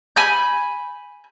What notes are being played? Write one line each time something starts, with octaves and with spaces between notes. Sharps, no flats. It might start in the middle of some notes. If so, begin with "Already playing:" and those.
G#5 B5 G6